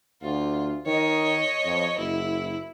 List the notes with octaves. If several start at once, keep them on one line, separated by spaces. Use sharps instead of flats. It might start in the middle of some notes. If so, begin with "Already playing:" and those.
D2 F4
D#3 C#5 D#5
F2
F#1 E4